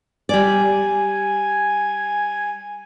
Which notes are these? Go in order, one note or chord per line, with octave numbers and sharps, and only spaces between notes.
G3 D5 G#5